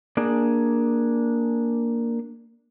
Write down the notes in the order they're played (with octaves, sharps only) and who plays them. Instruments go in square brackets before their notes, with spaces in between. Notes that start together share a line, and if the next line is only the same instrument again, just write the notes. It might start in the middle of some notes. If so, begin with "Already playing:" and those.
[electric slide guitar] A#3 D4 G#4